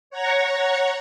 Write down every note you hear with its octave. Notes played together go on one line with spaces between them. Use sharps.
C#5 F#5 A#5 C#6